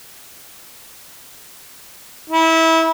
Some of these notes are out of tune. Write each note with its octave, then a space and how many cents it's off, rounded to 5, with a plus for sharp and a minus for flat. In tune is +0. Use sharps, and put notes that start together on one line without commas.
E4 -25